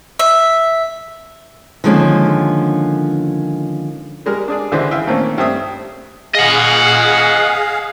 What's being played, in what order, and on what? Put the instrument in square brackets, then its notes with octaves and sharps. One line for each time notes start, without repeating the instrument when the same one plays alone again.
[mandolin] E5
[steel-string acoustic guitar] D3 D#3 F3 G#3 A#3 C#4
[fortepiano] G3 G#3 A#4
D4 G#4 D5
C#2 D3 E3 G#3 C5 E5
E5 F5 G5 G#5
A#2 D#3 A3 A#3 C4 C#4
G2 A3 C4 E5 D#6
[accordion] G#4 F5 [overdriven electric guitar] D#5 F#5